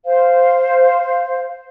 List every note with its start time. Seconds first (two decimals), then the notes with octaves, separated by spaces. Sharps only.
0.06 C5 F5